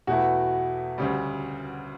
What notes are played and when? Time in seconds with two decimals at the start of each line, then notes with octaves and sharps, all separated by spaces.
0.07 E2 B2 A3 E4 F#4
0.98 D2 C#3 G3